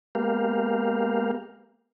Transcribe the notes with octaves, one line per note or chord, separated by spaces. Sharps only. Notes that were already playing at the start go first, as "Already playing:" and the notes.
G#3 A#3 B3 G4 A#4 F5